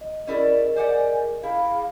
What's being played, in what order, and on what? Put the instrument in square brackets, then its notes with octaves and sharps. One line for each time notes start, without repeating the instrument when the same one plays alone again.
[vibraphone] D#5
[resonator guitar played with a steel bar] C#4 E4 D5 [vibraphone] G#4 A#4 D#5
[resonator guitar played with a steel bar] C5 D5 F#5 [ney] G#5
[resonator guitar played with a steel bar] E4 [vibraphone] G#4 B5 [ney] F5